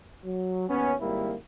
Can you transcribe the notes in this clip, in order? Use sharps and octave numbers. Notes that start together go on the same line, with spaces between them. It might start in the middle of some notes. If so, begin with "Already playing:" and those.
F#3
D#2 B3 C#4
G#1 G3 A#3 E4